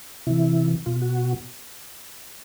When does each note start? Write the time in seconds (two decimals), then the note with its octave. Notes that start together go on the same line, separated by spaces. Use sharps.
0.27 C3 E3 E4
0.86 B2 F4
1.02 F#4